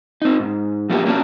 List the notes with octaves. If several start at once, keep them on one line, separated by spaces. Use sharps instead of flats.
C4 D#4
G#2
F3 A#3 B3 D4 G4
A#3 C#4 D4 F#4